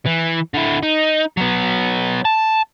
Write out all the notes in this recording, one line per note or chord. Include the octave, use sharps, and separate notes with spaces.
E3
D3 E4
D#4
F#3 B3
A5